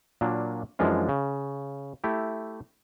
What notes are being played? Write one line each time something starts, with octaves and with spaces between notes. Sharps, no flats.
A#2 F#3 A#3 D4
F#2 E3 F3 G#3 D4 F4
C#3
A3 E4 G4